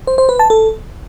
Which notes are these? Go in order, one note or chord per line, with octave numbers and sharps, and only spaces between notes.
C5
C5
B4
A5
A4